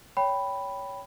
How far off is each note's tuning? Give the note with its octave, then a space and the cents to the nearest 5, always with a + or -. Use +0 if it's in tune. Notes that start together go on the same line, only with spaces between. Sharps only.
C#5 +15 G5 +0 B5 +0